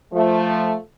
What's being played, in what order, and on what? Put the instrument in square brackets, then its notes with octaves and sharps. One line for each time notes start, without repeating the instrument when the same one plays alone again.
[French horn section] F3 A3